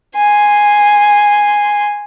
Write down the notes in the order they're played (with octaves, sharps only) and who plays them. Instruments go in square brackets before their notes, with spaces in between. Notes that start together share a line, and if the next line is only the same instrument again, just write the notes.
[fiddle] G#5 C6